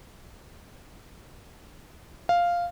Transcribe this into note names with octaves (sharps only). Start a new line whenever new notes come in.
F5